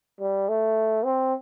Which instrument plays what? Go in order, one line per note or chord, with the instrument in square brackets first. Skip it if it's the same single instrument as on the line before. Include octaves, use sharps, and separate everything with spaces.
[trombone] G3
A3
C4